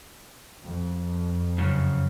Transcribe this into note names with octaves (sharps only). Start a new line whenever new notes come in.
F2
F#2 C#3